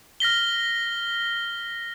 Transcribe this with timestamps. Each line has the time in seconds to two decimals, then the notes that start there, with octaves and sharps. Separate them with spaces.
0.20 F6 A#6 B6 G7